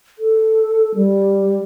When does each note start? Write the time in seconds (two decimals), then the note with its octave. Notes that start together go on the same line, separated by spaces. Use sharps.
0.19 A4
0.95 G3